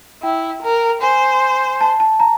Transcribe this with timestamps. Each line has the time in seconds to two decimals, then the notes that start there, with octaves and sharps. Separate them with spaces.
0.23 E4 G5
0.62 A#4
1.02 C5 G#5
1.81 A5
2.00 A5
2.20 A#5